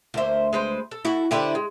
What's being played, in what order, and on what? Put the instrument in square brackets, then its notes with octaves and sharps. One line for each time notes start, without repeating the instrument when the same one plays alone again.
[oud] D2 E5 [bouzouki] A#3 C5
[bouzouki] G#3 B4 C5
A4
[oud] E4 F#4
[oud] D3 E4 G4 [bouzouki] B4 C5 D5
[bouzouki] G#3